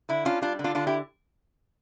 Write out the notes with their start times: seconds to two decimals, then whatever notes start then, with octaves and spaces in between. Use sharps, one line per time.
0.09 D3 E4
0.25 C#4 D4 F4
0.42 G3 D4 F4
0.59 D3
0.64 D4 F4
0.75 D3 D4 F4
0.87 E4 G4